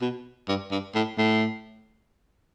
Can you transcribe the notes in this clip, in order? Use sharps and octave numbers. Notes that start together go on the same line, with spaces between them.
B2
G2
G2
A2
A2